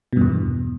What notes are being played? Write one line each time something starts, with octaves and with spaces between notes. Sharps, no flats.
E2 G2 B2